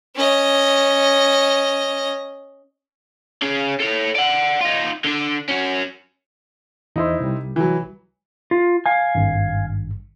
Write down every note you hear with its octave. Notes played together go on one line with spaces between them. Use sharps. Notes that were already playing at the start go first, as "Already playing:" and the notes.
C#4 D#5
C#4 G#4
A4 C#5
D5 F#5
D#4 F4
D3 D4
C#4 F#4
E2 D#4 E4 C5 D#5
C2 G3
E3 F#3
F4
F5 G#5
G#1 G2